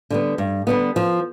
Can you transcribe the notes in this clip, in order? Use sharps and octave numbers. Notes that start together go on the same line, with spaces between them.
D3 G3 B3
G2
D3 G3 B3
F3